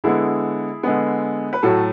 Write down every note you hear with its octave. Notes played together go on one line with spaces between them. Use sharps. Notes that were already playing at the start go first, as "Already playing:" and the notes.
D3 G#3 B3 E4 G#4
D3 G#3 B3
B4
A2 F#3 A3 F#4 A4